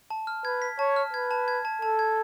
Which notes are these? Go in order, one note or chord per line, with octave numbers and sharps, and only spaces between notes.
A5
F6
B4 G#6
B6
C#5 A5
F6
B4 G#6
A5
G#6
A5
A4 A5
G#6